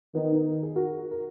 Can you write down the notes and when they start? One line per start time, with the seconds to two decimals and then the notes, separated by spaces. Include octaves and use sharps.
0.15 D#3 B3 D#4
0.32 B3 D#4
0.50 A#4
0.63 G#4
0.76 F#4 A#4
1.11 A#4